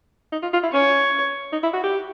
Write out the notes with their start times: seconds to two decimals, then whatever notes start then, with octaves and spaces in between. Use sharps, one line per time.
0.32 D#4
0.42 F4
0.53 F4
0.63 E4
0.72 C#4 C#5
1.52 D#4
1.63 E4
1.74 F#4
1.84 G4